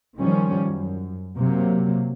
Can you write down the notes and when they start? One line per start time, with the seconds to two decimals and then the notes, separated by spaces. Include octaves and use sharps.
0.17 D#3 F3 G3 C#4
0.67 F#2
1.38 C3 F#3 A#3